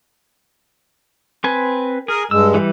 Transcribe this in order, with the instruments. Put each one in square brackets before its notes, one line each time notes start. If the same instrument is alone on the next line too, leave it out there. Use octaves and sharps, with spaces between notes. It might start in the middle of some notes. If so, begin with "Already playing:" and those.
[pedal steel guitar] C4 B4 G#5
[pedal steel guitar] G#4 [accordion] A#4
[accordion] G2 G#3 [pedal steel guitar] E6
[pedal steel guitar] E3 G3